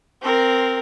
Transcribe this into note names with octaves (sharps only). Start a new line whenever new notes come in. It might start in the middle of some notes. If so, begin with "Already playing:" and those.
C4 A#4